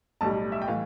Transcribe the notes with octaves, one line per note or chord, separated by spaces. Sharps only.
B1 A2 G3 A5
E5
G5
A2 E3 F5